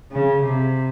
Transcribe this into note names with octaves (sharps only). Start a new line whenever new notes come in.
C#3
C3